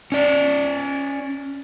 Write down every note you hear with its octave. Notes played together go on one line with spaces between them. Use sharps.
C#4 D5